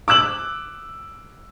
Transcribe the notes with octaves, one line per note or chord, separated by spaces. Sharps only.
D6 E6 F#6 F#7